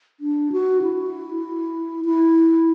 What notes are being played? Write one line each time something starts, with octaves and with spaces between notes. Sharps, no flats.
D4
F#4
E4
E4